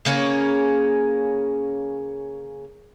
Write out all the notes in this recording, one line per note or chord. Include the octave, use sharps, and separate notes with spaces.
C#3 A#3 C#4 G#4